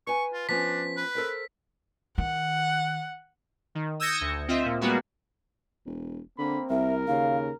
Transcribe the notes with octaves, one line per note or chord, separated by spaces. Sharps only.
B4 G#5 C#6
F4
F3 B3 C#4 D4 B6
B4
A4 A#4 C5
D#3 F#5
D#3
D#6 E6 G6 G#6 A#6 C#7
D2
C4 F4 D#5 E5
A#2
G3 G#3 A#3 B3 F#4
E1
D3 A#3 C4 B5
C2 A#4 E5
D#2 C#3 F5